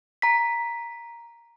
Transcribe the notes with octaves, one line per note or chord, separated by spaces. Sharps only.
A#5 B6